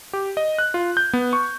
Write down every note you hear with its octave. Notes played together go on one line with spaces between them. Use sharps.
G4
D#5
F#6
F4
G6
B3
C#6